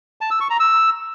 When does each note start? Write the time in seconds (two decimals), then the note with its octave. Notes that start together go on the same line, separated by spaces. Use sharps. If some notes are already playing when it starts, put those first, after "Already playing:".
0.21 A5
0.31 E6
0.40 C#6
0.50 A#5
0.60 E6